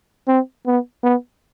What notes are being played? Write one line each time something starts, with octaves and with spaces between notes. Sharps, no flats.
C4
B3
B3